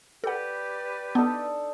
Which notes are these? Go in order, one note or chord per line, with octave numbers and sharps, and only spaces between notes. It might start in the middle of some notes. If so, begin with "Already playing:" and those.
G4 A4 B4 D5 F#5
B3 D4 D#4 A4